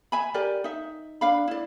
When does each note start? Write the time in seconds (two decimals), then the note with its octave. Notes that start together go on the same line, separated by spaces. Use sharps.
0.12 E5 G#5 B5
0.34 G4 A#4 D5 G#5
0.64 D#4 E5
1.21 D4 F5 B5
1.48 E4 D5